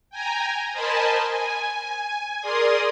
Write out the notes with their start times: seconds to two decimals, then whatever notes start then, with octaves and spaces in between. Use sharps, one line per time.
0.10 G5 G#5 A#5
0.72 A#4 C5 D#5 G#5 A5 B5
1.28 G#5
2.41 G#4 A#4 D5 C6 D#6